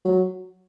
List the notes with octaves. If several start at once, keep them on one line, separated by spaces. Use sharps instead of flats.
F#3